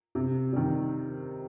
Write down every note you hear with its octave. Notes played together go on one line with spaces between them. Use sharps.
C3
D#3 G3